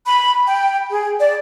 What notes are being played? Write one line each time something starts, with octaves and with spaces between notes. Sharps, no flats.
B5
G5
G#4
D5